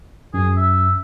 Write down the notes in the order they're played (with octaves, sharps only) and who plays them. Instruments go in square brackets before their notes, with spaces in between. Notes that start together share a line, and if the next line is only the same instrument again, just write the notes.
[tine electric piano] F#2 [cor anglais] G#4
[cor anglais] E5